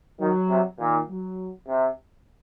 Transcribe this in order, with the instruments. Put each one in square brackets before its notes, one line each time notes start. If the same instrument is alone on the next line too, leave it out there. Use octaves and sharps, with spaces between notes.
[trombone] D#3 [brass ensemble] F#3
[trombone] C3
[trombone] A#2 [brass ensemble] D#3
[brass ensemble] F#3
[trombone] C3